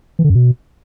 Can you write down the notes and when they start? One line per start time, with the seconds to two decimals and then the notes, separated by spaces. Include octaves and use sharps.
0.19 E3
0.24 D3
0.30 F#2
0.35 B2